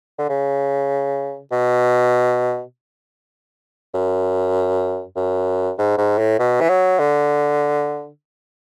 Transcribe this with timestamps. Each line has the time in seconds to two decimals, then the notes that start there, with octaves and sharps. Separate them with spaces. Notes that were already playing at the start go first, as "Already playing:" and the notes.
0.18 D3
0.29 C#3
1.52 B2
3.94 F#2
5.16 F#2
5.78 G#2
5.98 G#2
6.18 A2
6.39 B2
6.61 E3
6.69 F#3
6.99 D3